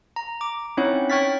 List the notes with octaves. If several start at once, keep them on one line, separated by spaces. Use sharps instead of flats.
A#5
D6
C4 C#4 D#4 E4 C#5 F#5
C#5 G5 C#6 F6 A6 B6